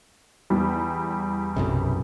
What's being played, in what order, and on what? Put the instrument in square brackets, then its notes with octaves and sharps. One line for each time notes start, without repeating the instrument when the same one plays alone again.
[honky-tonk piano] E2 G3
[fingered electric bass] B1 F#2 C3